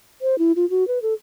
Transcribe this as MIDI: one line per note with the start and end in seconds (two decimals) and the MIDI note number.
0.22 0.38 72
0.38 0.52 64
0.56 0.68 65
0.70 0.86 66
0.88 0.99 71
1.02 1.14 69